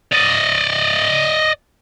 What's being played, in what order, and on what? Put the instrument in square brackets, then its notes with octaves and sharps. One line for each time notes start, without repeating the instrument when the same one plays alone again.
[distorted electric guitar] D5 D#5